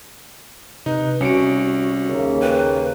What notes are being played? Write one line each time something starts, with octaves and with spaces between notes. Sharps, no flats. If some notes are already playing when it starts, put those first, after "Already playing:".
C3 D#4 B4
C2 C#4 F#4 C#7 D7
D#2 C#3 A#3
B4 G5